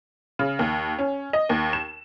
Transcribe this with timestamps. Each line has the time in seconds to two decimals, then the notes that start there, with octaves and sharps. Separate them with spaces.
0.39 C#3
0.59 D#2
0.99 C#4
1.33 D#5
1.49 D#2
1.73 E7